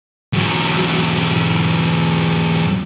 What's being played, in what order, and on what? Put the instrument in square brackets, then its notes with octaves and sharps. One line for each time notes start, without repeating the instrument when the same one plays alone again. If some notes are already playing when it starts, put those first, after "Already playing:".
[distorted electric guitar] E2 F#3